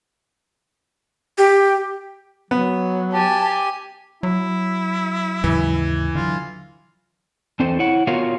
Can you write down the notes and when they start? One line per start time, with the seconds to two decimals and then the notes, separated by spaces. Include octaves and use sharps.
1.38 G4
2.51 F#3 B3
3.13 G4 G#5 A5
4.23 F#3 E4
5.44 D#2 G#2 C#3 E3
6.15 D3 F#3 F4
7.60 E2 C4 A4 C5
7.79 E4 C#5 F#5
8.07 B3 F4 F#4 A#4 C#5 F5